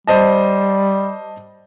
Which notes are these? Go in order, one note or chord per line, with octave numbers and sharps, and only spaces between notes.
G3 C5 D#5 A5